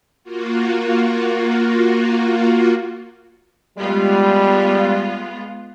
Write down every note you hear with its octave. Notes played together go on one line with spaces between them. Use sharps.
A#3 F4 F#4
G3 G#3 B3 F4